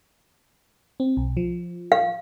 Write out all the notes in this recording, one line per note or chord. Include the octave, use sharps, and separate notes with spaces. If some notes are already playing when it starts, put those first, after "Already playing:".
C4
B1
F3
F5